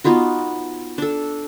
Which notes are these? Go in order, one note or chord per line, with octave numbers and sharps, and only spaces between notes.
B3 D#4 F4 F#4
D4 A4